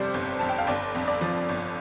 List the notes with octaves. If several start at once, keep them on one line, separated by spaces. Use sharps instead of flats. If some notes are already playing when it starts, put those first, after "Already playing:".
Already playing: G1 F2 C3 G3 C5 D5
G1
F2 A5
G5
F5
G1 D5
F2
D5
F3
G1